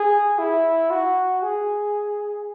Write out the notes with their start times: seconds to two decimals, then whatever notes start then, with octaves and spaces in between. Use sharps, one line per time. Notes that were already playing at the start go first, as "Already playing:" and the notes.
Already playing: G#4
0.39 E4
0.90 F#4
1.42 G#4